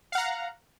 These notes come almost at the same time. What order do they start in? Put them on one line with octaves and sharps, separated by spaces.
F5 F#5 A#5